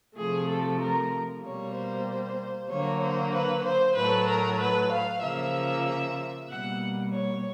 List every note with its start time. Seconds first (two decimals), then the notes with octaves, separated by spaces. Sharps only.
0.17 C3 F3 A3 G#4
0.49 A4
0.81 A#4
1.43 B2 G3 A#3 C#5
1.76 C5
2.70 D3 F#3 A#3 C#5
3.01 C5
3.33 B4
3.64 C5
3.96 A2 F#3 A3 B4
4.28 A#4
4.59 B4
4.91 F5
5.22 C#3 F3 A#3 E5
6.49 B2 G3 A#3 F#5
7.13 C#5